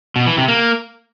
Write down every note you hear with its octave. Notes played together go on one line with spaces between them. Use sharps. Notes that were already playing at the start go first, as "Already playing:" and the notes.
B2
E3
C3
A#3